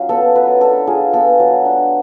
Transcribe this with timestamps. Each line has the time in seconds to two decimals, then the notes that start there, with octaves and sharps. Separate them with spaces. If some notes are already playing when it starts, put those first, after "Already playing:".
Already playing: F#3 C#4 F4
0.09 B3 A4
0.35 F#3 B4
0.61 D4 A4
0.87 F4 G#4
1.13 B3 A4
1.40 F#3
1.65 D4